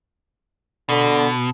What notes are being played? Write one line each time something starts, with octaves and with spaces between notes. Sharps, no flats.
B2 D3